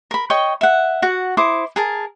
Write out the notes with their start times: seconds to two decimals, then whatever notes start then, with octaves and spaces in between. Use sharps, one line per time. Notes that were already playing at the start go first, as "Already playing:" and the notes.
0.11 A#4 B5
0.30 C#5 D#5 G5 C#6
0.61 E5 F#5
1.02 F#4 F#5
1.37 E4 C5 D6 D#6
1.76 G#4 A#4 A5